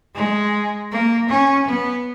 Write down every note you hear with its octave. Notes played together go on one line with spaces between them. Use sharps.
G#3
A#3
C#4
B3